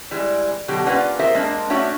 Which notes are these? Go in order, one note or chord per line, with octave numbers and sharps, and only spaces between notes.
E3 G3 G#3
B2 D3 F#3 G4
A#3 C#4 F4 B4 D5 F#5
F4 G#4 A#4 C5 E5
G#3 A#3 C4 D4
A3 C#4 D4 F#4 C#5 E5